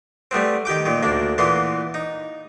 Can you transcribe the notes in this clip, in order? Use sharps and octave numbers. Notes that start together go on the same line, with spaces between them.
G3 A3 B3 C4
D#3 G4 G5 D6
A#2 D#3
D2 A#3 D4
A#2 E3 A#3 B3 C6
D#4